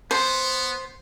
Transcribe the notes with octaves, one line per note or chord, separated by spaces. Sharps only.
B3 C5